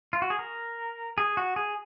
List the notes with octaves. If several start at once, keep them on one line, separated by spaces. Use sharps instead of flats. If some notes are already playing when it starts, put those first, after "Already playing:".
F4
F#4
G#4
A#4
G#4
F#4
G#4